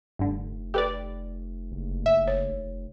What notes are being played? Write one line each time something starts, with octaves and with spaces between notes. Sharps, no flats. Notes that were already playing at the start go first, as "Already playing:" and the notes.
F1 G2 D3
G4 A4 B4 D5 G5
F#1
G1 E5
C#5